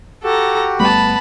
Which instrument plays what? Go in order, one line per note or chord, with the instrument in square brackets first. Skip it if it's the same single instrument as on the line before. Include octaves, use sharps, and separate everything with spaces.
[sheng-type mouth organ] F#4 G4 [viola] A4 A#5
[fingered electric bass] G1 G3 A3 [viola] B3 [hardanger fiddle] A5 B5